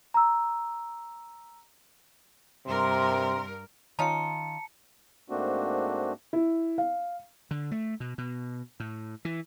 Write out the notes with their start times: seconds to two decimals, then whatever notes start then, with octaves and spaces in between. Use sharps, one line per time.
0.14 A#5 E6
2.66 G2 C3 A#4 A#5 C6
3.99 D#3 C#4 D#4 F4 A5 A#5 C#7
5.30 G#2 A3 A#3 C4 D4 F#4
6.33 E4
6.78 F5
7.51 D3
7.71 A3
8.00 B2
8.18 B2
8.80 A2
9.25 E3